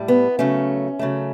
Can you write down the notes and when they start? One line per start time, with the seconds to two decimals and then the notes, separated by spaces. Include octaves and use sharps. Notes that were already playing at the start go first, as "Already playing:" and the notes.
Already playing: A2 G3
0.08 B3
0.39 C#3 F#3 A3 C#4
0.99 C#3 F#3 A3